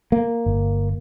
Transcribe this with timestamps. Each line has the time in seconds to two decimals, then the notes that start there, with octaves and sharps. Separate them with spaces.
0.12 A#3
0.46 G1